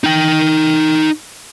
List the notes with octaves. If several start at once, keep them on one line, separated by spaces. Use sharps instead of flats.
D#4 G5